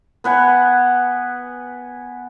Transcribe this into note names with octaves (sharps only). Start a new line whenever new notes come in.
B3 B4 F#5 G#5